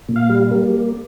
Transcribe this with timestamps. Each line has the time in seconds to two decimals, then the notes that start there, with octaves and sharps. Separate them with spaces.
0.09 A#2
0.16 F5
0.29 G3
0.51 A#3